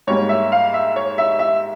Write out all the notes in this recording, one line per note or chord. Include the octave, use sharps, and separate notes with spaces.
G#2 G3 A#3 C#5
E5
F5
E5
C#5
E5
E5